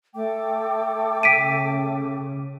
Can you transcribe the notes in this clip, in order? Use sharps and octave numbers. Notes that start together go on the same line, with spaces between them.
A3 A4 G5 D6
C#3 B6 D7 D#7